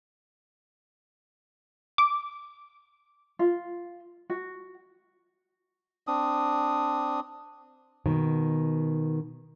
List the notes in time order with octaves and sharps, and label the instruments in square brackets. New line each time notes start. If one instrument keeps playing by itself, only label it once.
[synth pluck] D6
[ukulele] F4
F#4
[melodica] C4 D4 D#6
[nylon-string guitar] B2 D#3